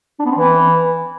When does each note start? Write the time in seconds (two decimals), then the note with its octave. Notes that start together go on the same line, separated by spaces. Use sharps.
0.19 D4
0.25 B3
0.31 C4
0.37 E3